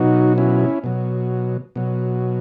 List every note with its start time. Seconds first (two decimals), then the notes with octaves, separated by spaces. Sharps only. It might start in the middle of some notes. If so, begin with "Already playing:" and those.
Already playing: B2 F#3 D#4 F#4
0.38 C#4 E4
0.84 B2 F#3
1.76 B2 F#3